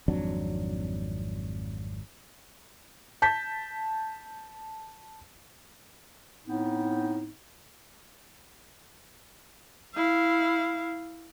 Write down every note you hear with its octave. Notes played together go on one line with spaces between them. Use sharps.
G#1 F2 F#3 D4
A5 G6 B6
A2 B3 C4 D#4
E4 F5